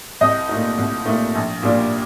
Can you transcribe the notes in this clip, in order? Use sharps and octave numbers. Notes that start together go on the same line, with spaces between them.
C2 D#5
A#2 A3 D#4
C2
A#2 A3 D#4
A#1
A#2 G3 D4